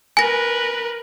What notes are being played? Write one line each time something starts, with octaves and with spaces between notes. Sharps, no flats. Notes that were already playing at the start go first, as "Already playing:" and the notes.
A#4 B4 G#5 A#6